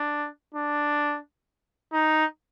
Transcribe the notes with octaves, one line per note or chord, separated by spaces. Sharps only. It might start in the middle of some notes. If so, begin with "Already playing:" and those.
Already playing: D4
D4
D#4